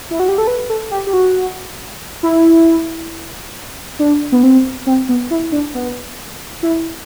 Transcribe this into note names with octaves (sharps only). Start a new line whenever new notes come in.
E4
F#4
G4
A4
B4
A4
G4
G4
F#4
E4
D4
B3
C4
C4
B3
E4
D4
B3
E4